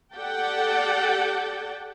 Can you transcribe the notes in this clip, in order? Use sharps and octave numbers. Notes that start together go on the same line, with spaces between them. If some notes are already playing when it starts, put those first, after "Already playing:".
G4 A4 D5 F#5 G5 A5